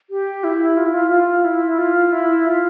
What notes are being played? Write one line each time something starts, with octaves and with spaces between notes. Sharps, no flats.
G4
E4
F4
E4
F4
F4
E4
F4
E4
F4